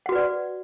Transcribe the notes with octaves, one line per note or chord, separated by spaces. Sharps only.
F#4 B4 D5 F#5